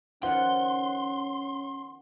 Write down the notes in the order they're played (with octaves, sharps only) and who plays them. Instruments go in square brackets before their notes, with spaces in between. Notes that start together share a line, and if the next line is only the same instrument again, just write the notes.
[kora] D#3 F3 B3 [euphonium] C#4 [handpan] F#5 [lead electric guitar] C6